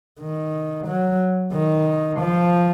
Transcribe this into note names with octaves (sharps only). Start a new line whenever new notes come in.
D#3
F#3
D#3
F3